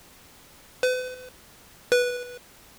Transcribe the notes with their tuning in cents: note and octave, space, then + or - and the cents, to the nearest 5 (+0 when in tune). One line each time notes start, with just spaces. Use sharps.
B4 +40
B4 -10